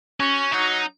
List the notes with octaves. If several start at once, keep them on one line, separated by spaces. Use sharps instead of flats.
C#4 F#4
F#3 D#4